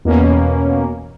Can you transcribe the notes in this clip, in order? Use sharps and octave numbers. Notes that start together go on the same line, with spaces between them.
E2 B2 A#3 C#4